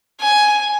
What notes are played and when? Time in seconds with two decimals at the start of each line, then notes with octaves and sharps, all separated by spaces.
0.21 G#5